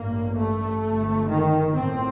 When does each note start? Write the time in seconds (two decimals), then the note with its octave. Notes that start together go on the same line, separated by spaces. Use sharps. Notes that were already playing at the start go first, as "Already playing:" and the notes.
Already playing: A1 G2 A#3
0.38 A3
0.85 G1 F2 C3
1.31 D#3
1.76 A#1 A2 C4